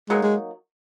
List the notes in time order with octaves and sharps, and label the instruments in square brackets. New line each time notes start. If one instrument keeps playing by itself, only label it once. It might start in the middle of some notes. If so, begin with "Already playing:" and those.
[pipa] F#3 A#3 D#4 [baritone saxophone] G#3
[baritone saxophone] G#3